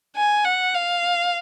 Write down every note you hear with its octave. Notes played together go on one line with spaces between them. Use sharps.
G#5
F#5
F5